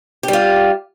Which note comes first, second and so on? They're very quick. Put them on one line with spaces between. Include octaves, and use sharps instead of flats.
G4 G3 F4